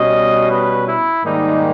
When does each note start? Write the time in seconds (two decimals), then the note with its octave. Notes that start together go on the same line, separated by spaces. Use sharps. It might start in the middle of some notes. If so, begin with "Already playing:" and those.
Already playing: B2 G3 C#4 D#5
0.49 B4
0.87 E4
1.24 G#2 D#3 G3 A#3 D#4